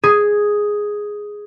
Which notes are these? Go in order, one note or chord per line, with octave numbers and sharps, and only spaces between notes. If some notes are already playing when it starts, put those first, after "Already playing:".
G#4